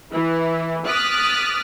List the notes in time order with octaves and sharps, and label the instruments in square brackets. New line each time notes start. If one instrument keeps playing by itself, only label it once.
[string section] E3 E4
D6 D#6 F6 F#6 A6 B6